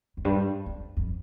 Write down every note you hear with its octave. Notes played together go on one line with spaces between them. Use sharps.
F2
G2
F2
F2